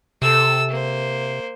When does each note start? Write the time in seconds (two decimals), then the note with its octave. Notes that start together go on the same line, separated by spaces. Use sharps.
0.22 C3 A4 E6
0.70 A#3 C5